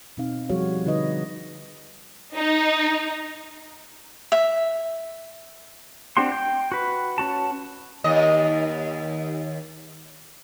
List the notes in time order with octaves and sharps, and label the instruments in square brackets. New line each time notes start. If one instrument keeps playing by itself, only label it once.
[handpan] B2 C4 D#4 F5
F3 G3 F#4 G#4 C#5 F5
D3 D#4 B4 D#5
[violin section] D#4
[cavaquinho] E5
[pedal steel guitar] C4 D4 G4 F#5 C6
G5
F#4 B4
C#4 F#4 A5
[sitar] D#2 D#5